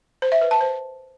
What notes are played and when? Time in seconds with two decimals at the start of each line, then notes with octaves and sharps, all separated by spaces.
0.22 C5
0.32 E5
0.41 B4
0.51 A5
0.61 C5